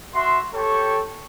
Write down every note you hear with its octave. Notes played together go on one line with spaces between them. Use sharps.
F#4 E5 C6
G4 A4 C#5 G5 C#6